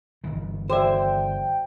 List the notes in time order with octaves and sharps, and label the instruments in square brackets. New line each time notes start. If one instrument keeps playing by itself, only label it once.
[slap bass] G1 D#3 E3
[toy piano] F#4 A4 D5 [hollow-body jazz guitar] C5 E5 [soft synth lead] G5